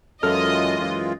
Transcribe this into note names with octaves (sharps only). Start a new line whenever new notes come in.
F#2 E3 G#3 F4 A4 D#5 F6
F#2